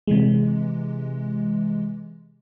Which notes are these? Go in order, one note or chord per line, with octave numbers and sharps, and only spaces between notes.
C3 E3 G#3